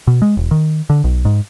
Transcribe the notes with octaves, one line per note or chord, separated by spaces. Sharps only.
B2
G#3
E1
D#3
D3
B1
G#2